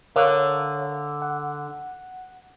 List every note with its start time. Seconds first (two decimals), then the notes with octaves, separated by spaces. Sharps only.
0.16 D3 A#4 C#5 F5
1.22 F#5